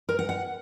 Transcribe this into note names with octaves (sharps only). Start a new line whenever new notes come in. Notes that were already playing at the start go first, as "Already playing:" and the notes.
A#4
F#5
F#5